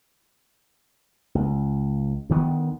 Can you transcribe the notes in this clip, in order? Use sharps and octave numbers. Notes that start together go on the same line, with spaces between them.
C#2
D2 D#3 B3